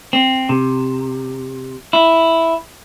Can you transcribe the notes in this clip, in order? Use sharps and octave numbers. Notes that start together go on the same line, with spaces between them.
C4
C3
E4